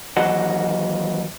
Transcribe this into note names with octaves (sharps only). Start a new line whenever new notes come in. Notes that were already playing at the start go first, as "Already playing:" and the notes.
D#2 E3 F#3 F#4 D#5 F#5